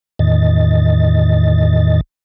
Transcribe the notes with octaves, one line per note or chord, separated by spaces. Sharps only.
E2 A2 D#3 D#5 A6